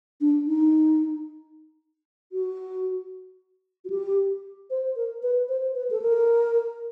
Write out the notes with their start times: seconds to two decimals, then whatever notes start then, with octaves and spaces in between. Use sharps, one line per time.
0.21 D4
0.47 D#4
2.32 F#4
3.85 F#4
3.90 G4
4.70 C5
4.96 A#4
5.23 B4
5.49 C5
5.76 B4
5.91 A4
6.02 A#4